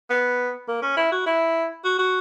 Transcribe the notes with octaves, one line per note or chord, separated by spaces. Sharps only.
B3
A#3
C#4
E4
F#4
E4
F#4
F#4